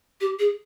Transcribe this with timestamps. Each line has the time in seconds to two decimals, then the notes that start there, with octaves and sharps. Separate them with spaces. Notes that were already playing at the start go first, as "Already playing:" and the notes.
0.21 G4
0.39 G#4